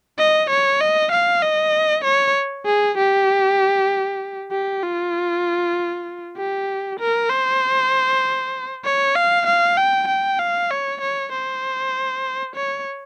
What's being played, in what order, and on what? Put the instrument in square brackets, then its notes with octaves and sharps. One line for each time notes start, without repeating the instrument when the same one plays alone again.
[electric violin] D#5
C#5
D#5
F5
D#5
C#5
G#4
G4
G4
F4
G4
A#4
C5
C#5
F5
F5
G5
G5
F5
C#5
C#5
C5
C#5